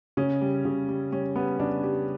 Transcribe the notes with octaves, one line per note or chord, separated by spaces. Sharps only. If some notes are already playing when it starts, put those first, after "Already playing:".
C#3 C#4
G3
C#3
G3
G3 C#4
G3 B3
C#3 D4
G3 G4